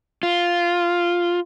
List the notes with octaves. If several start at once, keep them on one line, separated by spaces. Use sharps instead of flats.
F4